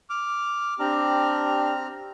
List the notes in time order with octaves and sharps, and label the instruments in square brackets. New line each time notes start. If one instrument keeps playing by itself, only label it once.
[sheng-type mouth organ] D6 F6
[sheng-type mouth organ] C4 A#5 F6 [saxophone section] D4 G4